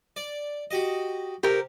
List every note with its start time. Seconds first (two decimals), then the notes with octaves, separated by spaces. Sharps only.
0.16 D5
0.71 F#4 G4 D#5
1.43 C3 G4 A#4